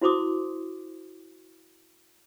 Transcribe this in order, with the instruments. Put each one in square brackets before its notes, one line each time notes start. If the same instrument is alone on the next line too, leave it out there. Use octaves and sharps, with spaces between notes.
[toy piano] E4 F#4 C5 C6 D6 D#6